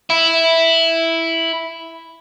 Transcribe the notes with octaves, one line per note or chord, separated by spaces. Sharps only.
E4 E5